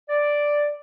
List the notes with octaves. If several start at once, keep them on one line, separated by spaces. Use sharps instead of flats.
D5